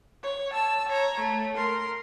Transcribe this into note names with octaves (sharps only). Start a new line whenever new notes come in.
C#5
A5 E6
C#5 A#5
A3
A#4 C6